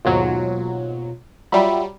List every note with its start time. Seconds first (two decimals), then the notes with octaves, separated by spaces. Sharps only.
0.05 D#2 G#2 B2 F#3 F4
1.52 F#3 G3 F4 E5 B5